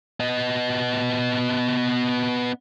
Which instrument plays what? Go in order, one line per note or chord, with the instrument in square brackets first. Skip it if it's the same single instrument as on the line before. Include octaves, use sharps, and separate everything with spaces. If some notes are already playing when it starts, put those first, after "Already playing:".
[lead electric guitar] B3 D#5